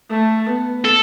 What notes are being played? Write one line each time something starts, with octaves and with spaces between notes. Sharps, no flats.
A3
B3
A4